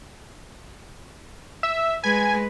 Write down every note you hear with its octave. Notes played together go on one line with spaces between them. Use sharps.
E5
G#3 B4 G#5